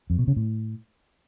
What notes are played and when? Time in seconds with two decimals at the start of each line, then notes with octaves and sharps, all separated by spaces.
0.10 F2
0.19 B2
0.27 C#3
0.36 A2